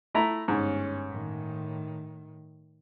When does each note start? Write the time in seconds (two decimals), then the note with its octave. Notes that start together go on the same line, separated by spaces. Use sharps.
0.14 A3 E4 A#5
0.48 G1 G#2 C#4
1.08 A2 D#3